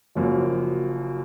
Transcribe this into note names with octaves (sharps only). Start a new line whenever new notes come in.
F#1 F#2 F3 A#3